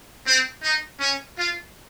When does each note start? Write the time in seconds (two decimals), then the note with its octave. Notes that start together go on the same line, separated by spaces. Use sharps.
0.26 C4
0.63 D#4
1.00 C#4
1.37 F4